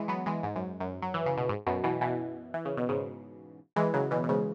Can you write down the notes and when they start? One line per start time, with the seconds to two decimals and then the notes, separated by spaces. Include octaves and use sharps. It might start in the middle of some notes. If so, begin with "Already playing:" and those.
Already playing: E3 G#3
0.08 F#3 B3
0.26 E3 G#3
0.43 G#2
0.56 F#2
0.80 F#2
1.02 F#3
1.14 E3
1.26 C#3
1.37 B2
1.49 G#2
1.67 F#2 B2
1.84 B2 E3
2.01 B2 E3
2.54 E3
2.65 C#3
2.77 B2
2.89 G#2 C#3
3.76 E3 G#3
3.94 C#3 F#3
4.11 B2 E3
4.23 B2
4.29 G#2 C#3